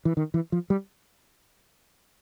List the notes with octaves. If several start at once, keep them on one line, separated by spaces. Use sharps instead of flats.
E3
D#3
E3
F3
G3